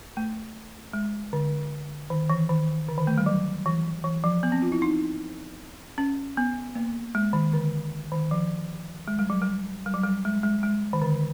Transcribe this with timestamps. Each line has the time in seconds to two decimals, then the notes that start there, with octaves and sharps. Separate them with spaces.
0.17 A3
0.93 G#3
1.33 D3
2.10 D#3
2.30 E3
2.49 D#3
2.89 D3
2.98 D#3
3.07 A3
3.18 G3
3.26 F#3
3.66 E3
4.04 E3
4.24 F3
4.43 B3
4.52 C4
4.62 F4
4.72 E4
4.82 D#4
5.98 C#4
6.37 B3
6.75 A#3
7.15 G#3
7.33 D#3
7.53 D3
8.11 D#3
8.31 F3
9.08 G#3
9.19 G3
9.30 F#3
9.42 G3
9.86 G3
9.94 F#3
10.03 G3
10.25 G#3
10.43 G#3
10.63 G#3
10.93 D#3
11.02 D3